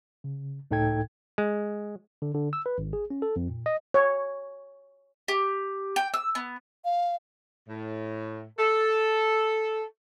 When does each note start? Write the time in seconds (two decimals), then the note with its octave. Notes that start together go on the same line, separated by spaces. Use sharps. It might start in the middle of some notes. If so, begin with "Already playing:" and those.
0.24 C#3
0.71 C#2 A2 D#4 A4 G5 G#6
1.38 G#3
2.22 D3
2.34 D3
2.53 E6
2.66 B4
2.78 G#1
2.93 G#4
3.10 C#4
3.22 A4
3.36 F2
3.50 A#2
3.66 D#5
3.94 C#5
5.28 G4
5.96 G5
6.14 E6
6.35 B3
6.85 F5
7.69 A2
8.59 A4